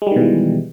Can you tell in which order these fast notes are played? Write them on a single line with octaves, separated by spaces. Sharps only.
G#3 G3 D#3 B2 E3